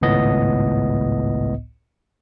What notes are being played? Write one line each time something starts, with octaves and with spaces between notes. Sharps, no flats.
G#1 C#2 A2 B3 D#5